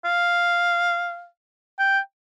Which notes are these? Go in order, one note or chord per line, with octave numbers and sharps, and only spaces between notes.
F5
G5